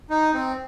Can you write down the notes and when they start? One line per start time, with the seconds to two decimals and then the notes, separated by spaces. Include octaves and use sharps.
0.10 D#4
0.34 C4